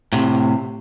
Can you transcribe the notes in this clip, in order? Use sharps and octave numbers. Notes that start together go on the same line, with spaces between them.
A2 C3